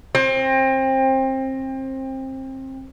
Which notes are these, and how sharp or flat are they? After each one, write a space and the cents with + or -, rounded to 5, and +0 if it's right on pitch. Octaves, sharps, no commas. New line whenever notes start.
C4 +25